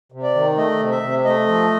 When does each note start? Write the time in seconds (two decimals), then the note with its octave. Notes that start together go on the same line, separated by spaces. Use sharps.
0.12 C3
0.23 D5
0.35 D#3
0.57 A3 D#5
0.80 C3
0.91 E5
1.03 C3
1.25 A3 D#5
1.48 F3